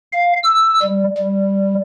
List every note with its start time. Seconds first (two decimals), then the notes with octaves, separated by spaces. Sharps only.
0.13 F5
0.43 E6
0.82 G3
1.17 G3